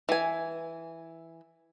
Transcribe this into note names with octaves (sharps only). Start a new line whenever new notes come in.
E3 G#5